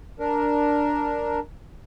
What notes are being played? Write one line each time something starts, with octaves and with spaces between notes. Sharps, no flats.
D4 A#4